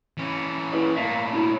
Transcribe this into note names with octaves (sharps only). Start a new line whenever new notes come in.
E3 C#4
E4 B4 D5
A2 A#3 E5 F5 A5
D4 E4